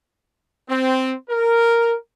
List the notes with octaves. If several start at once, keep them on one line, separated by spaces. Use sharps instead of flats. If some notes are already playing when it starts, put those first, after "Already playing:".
C4
A#4